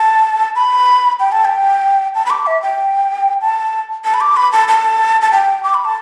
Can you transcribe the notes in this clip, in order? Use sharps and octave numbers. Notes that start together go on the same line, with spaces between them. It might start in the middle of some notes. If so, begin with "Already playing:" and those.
Already playing: A5
B5
G5
A5
G5
A5
B5
D6
E5
G5
A5
A5
B5
D6
B5
A5
A5
A5
G5
D6
B5
A5